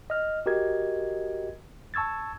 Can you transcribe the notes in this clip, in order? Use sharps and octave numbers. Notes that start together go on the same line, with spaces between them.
D#5 F6
F#4 G4 A#4 D#5 G#6
A5 C#6 E6 G#6 A6